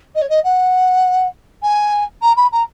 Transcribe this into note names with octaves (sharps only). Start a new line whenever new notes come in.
D#5
C#5
D#5
F#5
G#5
A#5
B5
A#5